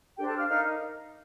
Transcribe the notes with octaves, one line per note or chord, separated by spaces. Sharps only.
D4 G4 A4 C5 G5
A4 A5
F5 F6
D#4 A#4 F5 F6